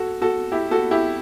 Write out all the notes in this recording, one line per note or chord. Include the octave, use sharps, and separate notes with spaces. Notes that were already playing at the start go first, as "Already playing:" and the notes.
Already playing: F#4 A4
F#4 A4
E4 G4
F#4 A4
E4 G4